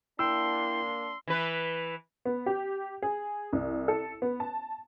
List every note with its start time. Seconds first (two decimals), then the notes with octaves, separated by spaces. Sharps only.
0.19 A#3 D4 E4 G5 C6 E6
1.27 E3 B4
2.25 B3
2.46 G4
3.02 G#4
3.53 C2
3.88 A4
4.22 B3
4.40 A5